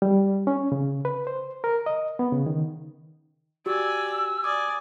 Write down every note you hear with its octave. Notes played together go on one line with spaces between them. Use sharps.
G3
C#4
C#3
B4
C5
A#4
D#5
B3
C#3
D#3
F#4 G4 D5 G#5 E6
D5 G#5 D6 D#6